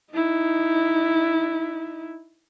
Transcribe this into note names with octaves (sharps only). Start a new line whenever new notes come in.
D#4 E4